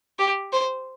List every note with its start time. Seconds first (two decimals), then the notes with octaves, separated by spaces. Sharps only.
0.19 G4
0.53 C5